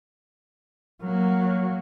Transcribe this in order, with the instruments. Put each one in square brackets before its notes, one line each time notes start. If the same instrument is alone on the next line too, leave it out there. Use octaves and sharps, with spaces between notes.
[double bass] F#3 A#3